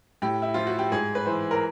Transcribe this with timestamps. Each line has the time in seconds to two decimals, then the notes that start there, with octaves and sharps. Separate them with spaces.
0.22 A2 G4
0.42 E4
0.54 F3 F4
0.67 F#4
0.79 G4
0.91 G#2 G#4
1.15 B4
1.25 E3 C5
1.51 A#4